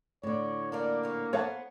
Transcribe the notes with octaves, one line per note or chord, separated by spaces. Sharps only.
A2 D3 C#5 D5
A#3 A4 A#4 D5
A#2 C#5
B3 A4 C5 C#5 F5 F#5 A5